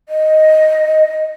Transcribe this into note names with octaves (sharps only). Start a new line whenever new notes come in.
D#5